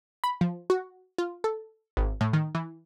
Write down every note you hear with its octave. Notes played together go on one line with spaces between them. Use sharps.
B5
F3
F#4
F4
A4
G#1
A2
D#3
E3